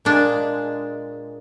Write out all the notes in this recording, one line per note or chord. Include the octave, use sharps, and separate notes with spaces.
A#2 G#3 D4